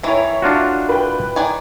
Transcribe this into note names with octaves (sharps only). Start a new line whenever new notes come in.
D#3 E3 C#5 E5
D4 F4 F#4
B4 G5
D#3 D5 G#5